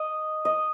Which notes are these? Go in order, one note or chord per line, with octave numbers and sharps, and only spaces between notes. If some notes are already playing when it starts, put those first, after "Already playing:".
Already playing: D#5
D#5